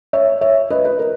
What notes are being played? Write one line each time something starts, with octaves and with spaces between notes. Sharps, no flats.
C#5 E5
C#5 E5
B4 D#5
B4
A#4